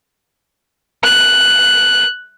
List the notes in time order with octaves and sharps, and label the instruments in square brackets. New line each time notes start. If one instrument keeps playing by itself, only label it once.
[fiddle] F#6